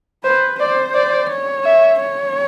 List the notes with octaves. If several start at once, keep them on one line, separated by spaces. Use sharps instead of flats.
B4 C5
C5 D5
D5
C#5
E5
C#5